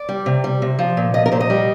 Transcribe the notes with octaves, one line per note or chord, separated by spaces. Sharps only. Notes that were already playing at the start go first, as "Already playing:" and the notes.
Already playing: D5
G3
C3
G3
C3
F3
A#2
F3 D#5
A#4
A#2 C5
D#5
G3